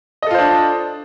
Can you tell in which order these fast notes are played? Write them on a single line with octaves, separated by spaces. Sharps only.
D#5 A4 F4 C5 D4